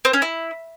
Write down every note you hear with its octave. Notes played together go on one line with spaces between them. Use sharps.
C4
C#4
E4